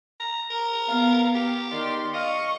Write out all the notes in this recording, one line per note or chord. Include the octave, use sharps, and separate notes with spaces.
A#5
A#4
B3 F5
G4
D#3 D5 C6
D#5 F5 C#6